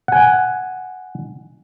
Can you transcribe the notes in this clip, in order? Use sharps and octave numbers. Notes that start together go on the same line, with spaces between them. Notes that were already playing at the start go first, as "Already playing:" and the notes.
F#5 G#5